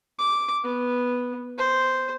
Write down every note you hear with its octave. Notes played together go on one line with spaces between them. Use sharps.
D6
B3
C5